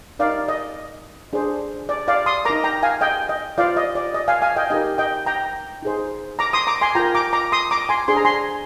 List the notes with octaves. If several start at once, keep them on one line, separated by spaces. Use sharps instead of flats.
D#4 A#4 D5 F5
D#5
D4 G#4 C5
D5
D5 F5
C6 D#6
D#4 A#4 A#5 D6
G5 A#5
F5 G#5
D#5 G5
D#5
F4 C5 D5 F5
D#5
D5
D#5
F5 G#5
F5 G#5
D#5 G5
D#4 G4 A#4 D#5
D#5 G5
G5 A#5
D#4 G#4 C5
A#5 D6
C6 D#6
A#5 D6
G#5 C6
F4 A#4 G5 A#5
A#5 D6
A#5 D6
C6 D#6
A#5 D6
G#5 C6
D4 G#4 C5 C6
A#5
G#5 C6